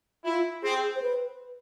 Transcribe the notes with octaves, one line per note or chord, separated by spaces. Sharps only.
E4 F4
C4 G#4
C5
B4